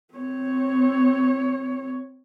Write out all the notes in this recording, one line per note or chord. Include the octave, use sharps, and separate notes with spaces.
C4 C#5